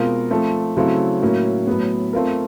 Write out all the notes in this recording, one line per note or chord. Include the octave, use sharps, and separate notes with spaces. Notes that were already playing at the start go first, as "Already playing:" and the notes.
Already playing: B2 G#3 C4 F4 A#4
F3 A3 C4
C#3 F#3 A3 C4 E4
A2 F#3 A#3 C#4 E4
A2 F#3 B3
A3 C4 F4 A#4